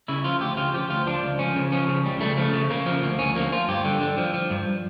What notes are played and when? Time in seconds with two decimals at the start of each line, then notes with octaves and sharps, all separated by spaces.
0.08 C#3 E4
0.24 F3 F4
0.41 D2 G4
0.57 C#3 F4
0.74 F3 G4
0.90 D2 F4
1.07 F3 D4
1.23 C#2
1.39 F3 C#4
1.56 C#3
1.72 F3 C#4
1.88 C#3
2.05 C#2 G3
2.21 C#3 A3
2.37 F3 A3
2.54 C#3
2.70 C#3 A#3
2.86 F3
3.03 D2 A#3
3.19 D2 C#4
3.35 F3 A#3
3.52 F3 F4
3.68 G2 G4
3.85 D3
4.01 D3
4.18 F3
4.34 F3
4.50 G2